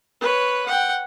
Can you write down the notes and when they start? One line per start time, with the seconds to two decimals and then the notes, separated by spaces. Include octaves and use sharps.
0.21 B4 C#5
0.66 F#5 G5